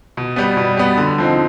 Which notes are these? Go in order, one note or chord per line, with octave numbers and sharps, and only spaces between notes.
B2
G3 B3
B2
G3 B3
D3
F3 C4 D#4